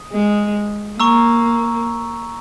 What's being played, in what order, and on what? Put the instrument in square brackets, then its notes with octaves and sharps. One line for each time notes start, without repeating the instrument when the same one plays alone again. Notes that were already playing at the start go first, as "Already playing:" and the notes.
Already playing: [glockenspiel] D#6
[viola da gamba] G#3
[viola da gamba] A#3 [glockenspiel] A#5 C#6 E6